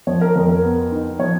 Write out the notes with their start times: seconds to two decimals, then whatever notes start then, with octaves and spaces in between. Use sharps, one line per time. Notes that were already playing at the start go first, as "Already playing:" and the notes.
0.07 F3 C#5
0.21 A#4
0.36 F2 A#4
0.49 A#4
0.64 B3
0.92 D#4
1.19 F3 C#5